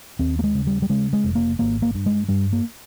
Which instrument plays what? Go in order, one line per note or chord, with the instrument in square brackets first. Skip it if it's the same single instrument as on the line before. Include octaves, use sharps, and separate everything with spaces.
[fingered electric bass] D#2 C4
A#3
G#3
C#3
G3
G3
C#3 G#3
G#3
F1
A#3
G#1 A#3
A#3
G2
G#3
G2 G3
A#3